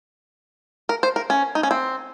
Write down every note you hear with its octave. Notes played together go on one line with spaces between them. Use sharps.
A#4
C5
A#4
C#4
D#4
C#4
C4